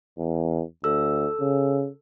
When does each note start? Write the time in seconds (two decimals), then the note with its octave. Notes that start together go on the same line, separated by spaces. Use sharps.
0.19 E2
0.84 D2 A4 E6
1.41 C#3